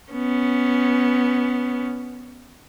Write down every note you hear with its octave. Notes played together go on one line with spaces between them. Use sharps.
B3 C#4